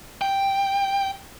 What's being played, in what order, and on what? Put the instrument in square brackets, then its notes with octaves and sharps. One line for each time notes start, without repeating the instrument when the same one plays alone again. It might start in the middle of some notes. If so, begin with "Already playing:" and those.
[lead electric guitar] G5